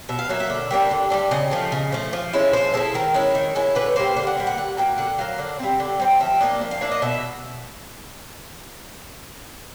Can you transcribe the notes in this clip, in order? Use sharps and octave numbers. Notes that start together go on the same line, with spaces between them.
B2 E5
F5
F#3 A#3 E5
E5
D3
G3 A#3 D4
D3
G3 A#3 D4
C#3 D#5
F3 A3
C#3
F3 A3
F3
G#3 C#4 E4
F3 C5
G#3 C#4 E4 A4
D#3 A#4
G#3 C#4 E4
D#3
G#3 C#4 E4
D3 B4
C#5
G3 A#3 C5
D3 F5
F#5
G3 A#3
F#5
D3 F#5
F#3 A#3 G5
D3 F#5
F#3 A#3 F5
D3
G3 C4
D3
G3 C4
F3 E5
A#3 D4 D#5
F3
F5
A#3 D4 E5
D#5
B2 E5